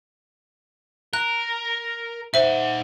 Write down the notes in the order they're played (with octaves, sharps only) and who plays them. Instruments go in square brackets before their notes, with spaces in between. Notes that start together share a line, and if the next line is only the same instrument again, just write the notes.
[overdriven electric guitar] A#4 [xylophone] F#6
[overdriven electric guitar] D#4 F#5 [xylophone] C5 E5